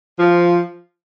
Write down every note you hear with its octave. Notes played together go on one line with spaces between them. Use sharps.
F3